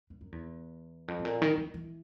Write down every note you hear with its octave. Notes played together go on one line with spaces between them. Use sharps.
G2
F#2
E2
F2
A2
A#2
D#3
E3
E3